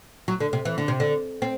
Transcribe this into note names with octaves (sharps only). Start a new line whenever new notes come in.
F#3
D3
C3
E3
D3
C3
D3
C4